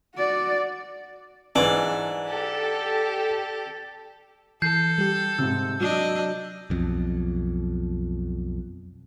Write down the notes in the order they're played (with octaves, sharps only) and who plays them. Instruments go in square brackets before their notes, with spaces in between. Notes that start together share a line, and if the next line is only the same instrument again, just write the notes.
[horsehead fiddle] F#4 D5
[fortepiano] G#2 E3 [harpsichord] D4
[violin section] G4 A4
[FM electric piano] E3 C7 [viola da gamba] A4 [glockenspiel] G6
[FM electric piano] G3 G4
[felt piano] G#2 C3 [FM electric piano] E6
[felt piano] F#3 [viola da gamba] D4 D#5
[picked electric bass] B1 F2